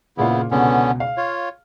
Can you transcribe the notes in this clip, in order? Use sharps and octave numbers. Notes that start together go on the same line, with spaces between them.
F#1 A#2 C#3 B3 E4 F5
C#2 B2 D3 B3 C#4
F5
F4 C#5